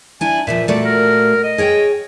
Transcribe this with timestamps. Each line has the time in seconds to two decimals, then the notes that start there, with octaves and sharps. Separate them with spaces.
0.21 D4 E4 G#5
0.47 A#2 E3 F3 E5
0.68 A#2 A3 F#4 D5
0.85 A#4
1.44 D#5
1.58 G#4 C#5 G5